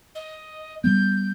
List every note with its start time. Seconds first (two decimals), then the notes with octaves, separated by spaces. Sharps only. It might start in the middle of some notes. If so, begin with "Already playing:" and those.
0.15 D#5
0.84 G3 B3 G6